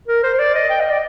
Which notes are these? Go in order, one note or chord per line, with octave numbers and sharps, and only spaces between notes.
A#4
C5
C5
D5
D#5
G5
D#5
D5